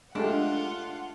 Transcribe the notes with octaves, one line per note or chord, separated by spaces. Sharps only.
G#3 A3 D4 F4 G4 F#5